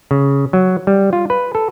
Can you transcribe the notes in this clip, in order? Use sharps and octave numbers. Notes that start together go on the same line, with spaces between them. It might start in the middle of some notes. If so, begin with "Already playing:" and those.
C#3
F#3
G3
F4
B4
A4